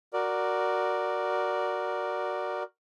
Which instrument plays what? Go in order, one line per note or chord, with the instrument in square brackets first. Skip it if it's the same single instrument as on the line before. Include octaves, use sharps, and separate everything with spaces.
[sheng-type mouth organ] F#4 A#4 D5